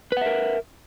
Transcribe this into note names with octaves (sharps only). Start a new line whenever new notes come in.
A#4 B4 E5 F#5